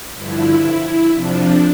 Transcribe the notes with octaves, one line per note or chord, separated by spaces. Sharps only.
G2 D3 F3 E4
F2 C3 F3 D4